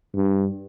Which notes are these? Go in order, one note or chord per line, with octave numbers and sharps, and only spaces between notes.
G2